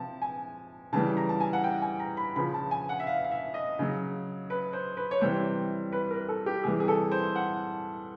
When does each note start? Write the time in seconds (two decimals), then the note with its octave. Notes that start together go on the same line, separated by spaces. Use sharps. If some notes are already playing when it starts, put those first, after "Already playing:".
Already playing: C3 F3 A5
0.22 G#5
0.93 C#3 E3 G3 A5
1.17 A#5
1.29 A5
1.40 G#5
1.53 F#5
1.64 G5
1.82 G#5
2.00 A#5
2.17 B5
2.36 C#3 F3 B5
2.54 A5
2.71 G#5
2.89 F#5
2.99 E5
3.07 F5
3.24 F5
3.31 E5
3.54 D#5
3.79 C#3 F#3
4.50 B4
4.73 C5
4.97 B4
5.11 C#5
5.21 C3 E3 G3 C5
5.92 B4
6.11 A#4
6.28 A4
6.46 G4
6.64 C3 E3 G3 G#4
6.80 G#4
6.88 A4
7.12 C5
7.36 F#5